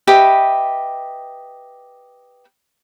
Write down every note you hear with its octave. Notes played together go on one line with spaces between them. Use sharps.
G4 B4 D#5 E5